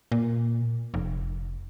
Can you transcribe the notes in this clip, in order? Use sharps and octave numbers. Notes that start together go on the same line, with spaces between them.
A#2
F1